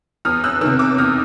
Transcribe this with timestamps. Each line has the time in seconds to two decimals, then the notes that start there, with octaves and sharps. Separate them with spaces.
0.25 E2 D#6 F6
0.44 E6 F#6
0.61 C3 D#3 E6 F#6
0.79 D6 E6
0.98 E2 D#6 F6